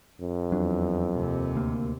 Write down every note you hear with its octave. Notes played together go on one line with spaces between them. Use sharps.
F2
E2 F#3 D4
D#2 C3
D2 A#3